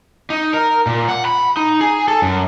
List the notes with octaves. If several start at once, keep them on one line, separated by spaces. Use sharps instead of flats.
D#4
A#4
A#2
F#5
B5
D#4
G#4
A4
F#2